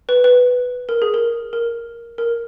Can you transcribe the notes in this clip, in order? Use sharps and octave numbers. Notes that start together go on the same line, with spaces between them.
B4
B4
A#4
G#4
A#4
A#4
A#4